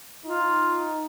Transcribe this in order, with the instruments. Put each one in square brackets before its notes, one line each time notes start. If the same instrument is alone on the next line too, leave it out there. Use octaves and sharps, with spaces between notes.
[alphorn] D#4 [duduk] F4